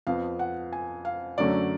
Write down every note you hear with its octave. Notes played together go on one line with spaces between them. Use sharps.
F2 F3 B3 F5
F#5
G#5
F5
F#2 D3 F#3 A3 C#4 D5